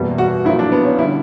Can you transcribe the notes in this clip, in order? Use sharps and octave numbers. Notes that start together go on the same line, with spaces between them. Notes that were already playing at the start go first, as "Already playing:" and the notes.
Already playing: F#1 E2 B2 G3
F#4
A#1 A#2 F#3 E4
D4
B3
C#4
D3 G3 E4